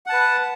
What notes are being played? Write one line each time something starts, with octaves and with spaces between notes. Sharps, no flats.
B4 F#5 A5